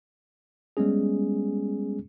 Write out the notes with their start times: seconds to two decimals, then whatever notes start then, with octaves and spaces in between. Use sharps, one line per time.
0.77 G3 G#3 B3 C#4 G#4